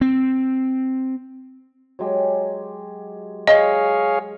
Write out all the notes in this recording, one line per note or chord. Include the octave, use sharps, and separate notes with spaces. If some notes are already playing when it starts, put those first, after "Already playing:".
C4
F#3 G#3 G4
G#4 C#5 D#5 F5